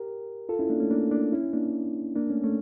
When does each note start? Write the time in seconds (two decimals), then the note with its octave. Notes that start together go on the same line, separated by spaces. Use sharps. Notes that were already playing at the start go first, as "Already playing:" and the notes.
Already playing: G4 A#4
0.49 F4 A4
0.59 C#4 E4
0.70 A#3 D4
0.80 A3 C#4
0.91 A#3 D4
1.11 A#3 D4
1.32 C#4 E4
1.53 A#3 D4
2.16 A#3 D4
2.30 A3 C#4
2.44 A3 C#4